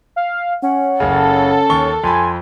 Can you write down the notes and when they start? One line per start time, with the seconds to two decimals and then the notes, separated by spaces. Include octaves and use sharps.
0.16 F5
0.62 C#4 F#5
1.00 F#1 C#3 A4
1.70 D#2 C#6 G7
2.04 F2 G#5 B5 C6